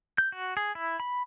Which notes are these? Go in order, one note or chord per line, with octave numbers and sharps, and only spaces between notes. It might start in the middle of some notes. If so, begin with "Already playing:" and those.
G6
F#4
G#4
E4
B5